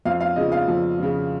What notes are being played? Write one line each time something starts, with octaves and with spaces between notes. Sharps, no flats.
F2 F5
F5
C#3 F3 D#5
F5
F2
C#3 F3